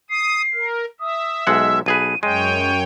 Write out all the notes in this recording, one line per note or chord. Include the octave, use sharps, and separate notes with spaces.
D#6 C7
A#4
E5 D#6
B1 G#3 F#5 E6
B1 G#4 B4 D#7
F#2 G#3 C#5 G5 D#7